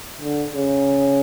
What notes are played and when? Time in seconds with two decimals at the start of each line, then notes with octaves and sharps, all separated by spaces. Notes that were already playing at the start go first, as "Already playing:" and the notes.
0.21 D3
0.53 C#3